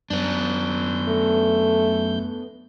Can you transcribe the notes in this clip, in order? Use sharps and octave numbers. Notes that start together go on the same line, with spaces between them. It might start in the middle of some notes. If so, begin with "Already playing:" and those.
F#2 B3 D4 G6
A3